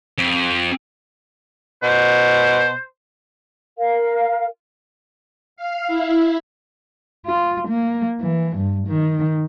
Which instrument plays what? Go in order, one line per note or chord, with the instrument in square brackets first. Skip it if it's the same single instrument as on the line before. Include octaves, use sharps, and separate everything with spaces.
[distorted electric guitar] F2
[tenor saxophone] B2 [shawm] C5
[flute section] A#4 F5
[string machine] F5
E4
[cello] F4
A#3
E3
G2
D#3